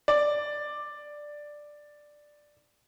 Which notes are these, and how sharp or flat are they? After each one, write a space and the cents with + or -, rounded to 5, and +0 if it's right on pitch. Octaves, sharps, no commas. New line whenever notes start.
D5 +5